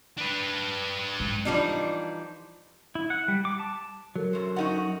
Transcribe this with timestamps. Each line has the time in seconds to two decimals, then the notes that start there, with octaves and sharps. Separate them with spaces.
0.18 D4 B4
1.20 G#2
1.45 E3 F3 G3 D4 D#4
2.95 E4
3.10 F#5
3.28 G3
3.45 D6
3.60 A5
4.16 F#3 A4 A#4
4.33 F#2 C5
4.56 F#2 D#4 F#4 F#5